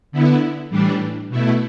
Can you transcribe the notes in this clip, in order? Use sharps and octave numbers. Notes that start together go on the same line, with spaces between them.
D3 B3 E4
A2 E3 G3 D4
B2 A3 E4